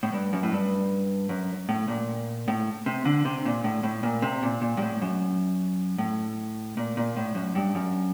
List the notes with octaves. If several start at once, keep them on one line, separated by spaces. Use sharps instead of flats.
A2
G2
F#2
A2
G2
F#2
A2
A#2
A2
C3
D3
C3
A#2
A2
A2
A#2
C3
A#2
A#2
G2
A2
F#2
A2
A#2
A#2
A2
F#2
G2
F#2